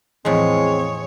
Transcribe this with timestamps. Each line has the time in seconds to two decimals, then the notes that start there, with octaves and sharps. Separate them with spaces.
0.25 E2 A2 F3 G#3 C4 C#5